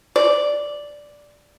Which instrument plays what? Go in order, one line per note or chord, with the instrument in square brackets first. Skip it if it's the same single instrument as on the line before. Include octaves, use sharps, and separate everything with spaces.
[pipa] D5